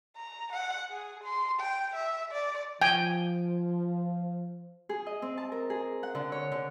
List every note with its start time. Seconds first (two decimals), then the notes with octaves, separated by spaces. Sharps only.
0.17 A#5
0.53 F#5
0.90 G#4
1.24 C6
1.60 G5
1.95 E5
2.32 D5
2.82 F3 G5 G#5
4.89 G#4
5.06 D#5
5.22 C4
5.37 A5
5.52 A#4
5.70 G#4
6.03 F#5
6.15 D3
6.32 C#5
6.52 D3